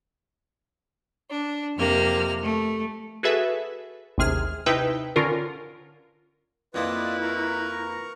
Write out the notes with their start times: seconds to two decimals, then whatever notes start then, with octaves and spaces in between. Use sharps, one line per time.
1.30 D4
1.77 F2 C3 A#3 F6
2.43 A3
3.23 F#4 G#4 A4 B4 E5
4.18 A1 D#2 C3 G#4 F6
4.66 C3 D#4 E4 B4 G5
5.16 D3 C#4 F4 A#4
6.74 F2 A#3 E4 F4 B4 D5 D#5
7.22 A#4 A#5 C#6